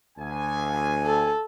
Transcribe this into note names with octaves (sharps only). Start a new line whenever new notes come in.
D2 G#5
A4